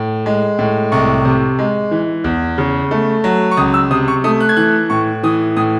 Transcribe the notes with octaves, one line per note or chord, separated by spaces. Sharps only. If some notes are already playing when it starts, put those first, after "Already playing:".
Already playing: A2
G#3
A2
C2 C#6
C3
G#3
E3
E2
C#3
A3
F#3
C#6
C#2 D#6
E6
C3 D#6
C#6
A3 D#6
F#6
G#6
E3 F#6
A2 C#6
E3 D#6
A2 D#6